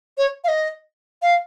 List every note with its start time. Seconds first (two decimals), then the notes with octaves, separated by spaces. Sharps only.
0.18 C#5
0.44 F5
0.48 D#5
1.22 F5